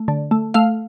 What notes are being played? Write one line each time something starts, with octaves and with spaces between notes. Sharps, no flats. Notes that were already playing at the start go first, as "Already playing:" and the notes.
Already playing: A3
D3
A3
A3 F5